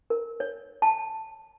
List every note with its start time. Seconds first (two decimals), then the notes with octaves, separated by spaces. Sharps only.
0.10 A#4
0.40 C#5
0.82 A5